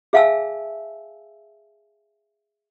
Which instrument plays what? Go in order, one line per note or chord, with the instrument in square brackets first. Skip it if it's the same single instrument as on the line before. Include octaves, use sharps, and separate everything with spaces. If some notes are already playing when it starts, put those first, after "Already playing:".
[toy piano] G#4 E5 F5 G#5 A5 E6